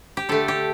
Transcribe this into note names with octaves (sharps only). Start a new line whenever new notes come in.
G4
D3 A3 A4
G4